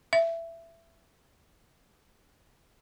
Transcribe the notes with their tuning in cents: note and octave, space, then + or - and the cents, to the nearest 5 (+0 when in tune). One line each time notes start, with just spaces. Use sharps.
E5 +15